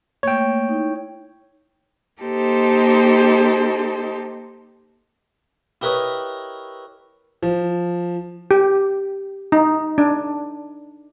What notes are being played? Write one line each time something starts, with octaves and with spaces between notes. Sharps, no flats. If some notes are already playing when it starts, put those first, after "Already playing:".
A3 A#3 C#5 G5
D#4 E4
A#3 D#4 G4 A4 C5
E4 G4 A#4 B4 C#5 D#5
F3
G4
D#4
D4